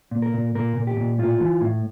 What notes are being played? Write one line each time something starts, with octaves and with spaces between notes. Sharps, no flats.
A#2
A#4
A#2
A#2 A#4
A#2
G4
A#2
A2 F4
E3
A2